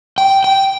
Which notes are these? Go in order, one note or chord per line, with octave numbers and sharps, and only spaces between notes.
G5
G5